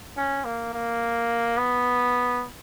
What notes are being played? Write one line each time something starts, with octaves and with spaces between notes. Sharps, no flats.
C#4
A#3
A#3
B3